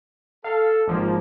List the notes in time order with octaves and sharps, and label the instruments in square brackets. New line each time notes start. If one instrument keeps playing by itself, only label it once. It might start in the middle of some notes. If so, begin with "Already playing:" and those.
[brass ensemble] A4 [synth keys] F5
[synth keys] G#1 F3 [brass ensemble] A#3